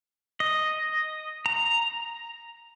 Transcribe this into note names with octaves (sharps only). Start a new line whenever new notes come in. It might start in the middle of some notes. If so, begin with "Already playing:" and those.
D#5
A#5